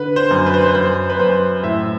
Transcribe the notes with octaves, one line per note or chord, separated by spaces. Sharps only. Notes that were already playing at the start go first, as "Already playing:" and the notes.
Already playing: D3 B4
C5
F#2
B4
C5
B4
F#2 C5
B4
F#2 C5
A2 E5